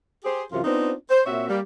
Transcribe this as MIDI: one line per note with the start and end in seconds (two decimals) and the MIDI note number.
0.25 0.43 67
0.25 0.43 68
0.25 0.43 72
0.52 0.62 42
0.52 0.62 48
0.52 0.62 52
0.52 0.62 65
0.65 0.93 59
0.65 0.93 60
0.65 0.93 62
0.65 0.93 63
0.65 0.93 65
0.65 0.93 72
1.11 1.22 72
1.26 1.49 46
1.26 1.49 60
1.26 1.49 66
1.26 1.49 73
1.26 1.49 76
1.49 1.60 55
1.49 1.60 58
1.49 1.60 67